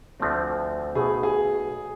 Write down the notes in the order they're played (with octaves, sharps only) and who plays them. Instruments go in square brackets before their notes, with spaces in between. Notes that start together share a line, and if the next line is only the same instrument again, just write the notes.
[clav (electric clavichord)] D2 D3 F3 A3 C4
[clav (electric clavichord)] B1 B2 A3 [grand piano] G#4
[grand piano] G#4